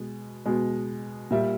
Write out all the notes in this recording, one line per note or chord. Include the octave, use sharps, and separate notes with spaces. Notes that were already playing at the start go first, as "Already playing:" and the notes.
Already playing: B2 G#3
B2 G#3
A#2 G3 E5